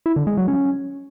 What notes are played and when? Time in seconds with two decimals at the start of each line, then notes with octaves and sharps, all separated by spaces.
0.06 E4
0.16 D3
0.27 G#3
0.37 F#3
0.48 C#4